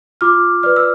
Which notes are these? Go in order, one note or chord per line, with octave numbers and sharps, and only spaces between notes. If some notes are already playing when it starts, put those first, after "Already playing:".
F4 D6 F6
B4 D5 F6
E6